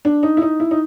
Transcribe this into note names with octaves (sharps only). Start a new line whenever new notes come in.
D4
D#4
E4
D#4
E4
D#4